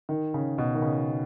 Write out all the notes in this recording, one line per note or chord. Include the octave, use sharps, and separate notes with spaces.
D#3
C#3
B2
D#3
C#3